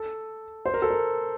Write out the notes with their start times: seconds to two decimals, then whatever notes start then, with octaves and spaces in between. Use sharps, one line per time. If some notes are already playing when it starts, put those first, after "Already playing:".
Already playing: A4
0.66 C5
0.74 A#4
0.82 A4
0.90 A#4